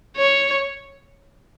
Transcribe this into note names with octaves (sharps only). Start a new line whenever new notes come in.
C#5